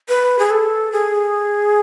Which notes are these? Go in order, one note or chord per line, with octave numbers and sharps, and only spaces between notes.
B4
G#4
A4
G#4